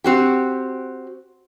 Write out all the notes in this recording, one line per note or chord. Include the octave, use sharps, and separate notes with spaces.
C4 F#4 G4